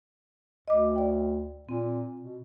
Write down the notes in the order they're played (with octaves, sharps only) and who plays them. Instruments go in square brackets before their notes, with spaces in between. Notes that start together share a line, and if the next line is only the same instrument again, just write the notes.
[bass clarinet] D2 [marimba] D#5 D6
[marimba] D5 G5
[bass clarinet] A#2 [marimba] C4
[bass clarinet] B2